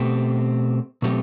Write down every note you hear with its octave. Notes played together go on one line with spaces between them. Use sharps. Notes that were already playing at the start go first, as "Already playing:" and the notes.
Already playing: B2 A3 C4 G4
B2 F#3 A3 C4 G4